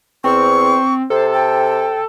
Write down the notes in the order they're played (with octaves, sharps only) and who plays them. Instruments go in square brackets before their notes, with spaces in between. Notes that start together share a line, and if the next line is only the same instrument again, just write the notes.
[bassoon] E2 [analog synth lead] C4 [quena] C#6
[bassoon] C3 [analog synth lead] A4 [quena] C5
[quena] G5